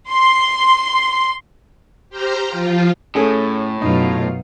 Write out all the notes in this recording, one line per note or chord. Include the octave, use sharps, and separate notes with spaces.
C6
G4 C5 G5 A#5 F6
F3 F4
A2 A3 C#4 G#4
F#2 B2 D#4 F4